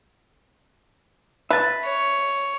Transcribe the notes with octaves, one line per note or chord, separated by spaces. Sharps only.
B4 E5 A5
C#5